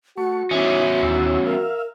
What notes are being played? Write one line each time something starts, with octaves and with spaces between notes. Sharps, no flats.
A3 F#4 F#5 C#6
E2 E3 C#4 D#4 E5
D#2 E3 E6
A#4 E5 F5